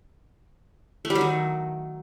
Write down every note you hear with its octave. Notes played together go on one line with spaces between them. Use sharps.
A3
G3
F#3
D#3